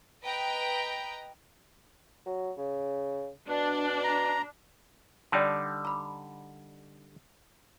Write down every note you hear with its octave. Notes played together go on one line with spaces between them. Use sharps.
B4 D#5 G5 A#5
F#3
C#3
B2 D4
A#5
D3 G3 D#4 D5 G5 A5
A#5 B5